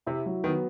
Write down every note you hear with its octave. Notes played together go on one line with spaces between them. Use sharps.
C3 E4
F#3
D#3 B3